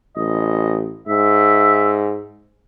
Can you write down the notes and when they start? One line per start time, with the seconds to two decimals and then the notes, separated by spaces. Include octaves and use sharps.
0.16 A1 D#5
1.07 G#2 E5